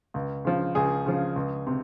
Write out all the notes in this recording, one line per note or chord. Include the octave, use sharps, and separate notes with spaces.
C#2
C#3 F3
C#2 G#4
C#3 F3
C#2
C3